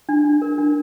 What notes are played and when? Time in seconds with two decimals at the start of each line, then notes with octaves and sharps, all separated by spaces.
0.09 D4
0.25 D4
0.42 A#4
0.58 D4